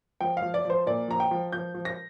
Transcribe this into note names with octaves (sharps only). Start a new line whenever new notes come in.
F3 G5
F5
F3
D5
F3 C5
A#2 D5
F3 A#5
G5
F3
F3 G6
F3
A#6